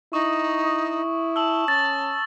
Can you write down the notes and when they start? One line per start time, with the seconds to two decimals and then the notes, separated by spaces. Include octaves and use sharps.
0.13 D#4 E4 C#6 D#6
1.36 A5 E6 F#7
1.68 C#4 A6